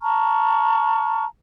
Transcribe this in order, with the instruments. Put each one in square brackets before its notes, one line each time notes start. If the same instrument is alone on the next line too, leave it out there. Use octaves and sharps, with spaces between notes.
[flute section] A5 A#5 C#6 F6